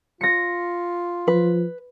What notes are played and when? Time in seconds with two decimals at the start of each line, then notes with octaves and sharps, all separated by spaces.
0.21 F4 A#6 C#7
1.28 F3 B4